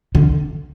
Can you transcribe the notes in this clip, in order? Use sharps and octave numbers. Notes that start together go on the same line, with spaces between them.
D3